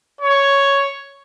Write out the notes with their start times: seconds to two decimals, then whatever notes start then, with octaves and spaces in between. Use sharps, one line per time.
0.21 C#5